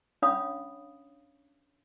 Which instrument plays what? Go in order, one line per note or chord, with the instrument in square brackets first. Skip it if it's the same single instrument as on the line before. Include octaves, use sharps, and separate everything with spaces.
[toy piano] C#4 D4 C#5 F5 B5 D#6